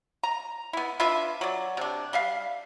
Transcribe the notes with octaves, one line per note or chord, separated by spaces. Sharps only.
A#5
B3 E4
D4 F4 B4 E5
F#3 D5
C3 D4
G3 E5 F5